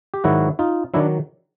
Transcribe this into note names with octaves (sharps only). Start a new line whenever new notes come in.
G4
G#2 D#3 F#3 E4 F#4
D#4 F4
D#3 F#3 D4 E4